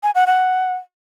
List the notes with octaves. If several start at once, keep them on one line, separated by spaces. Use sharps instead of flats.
G#5
F#5
F#5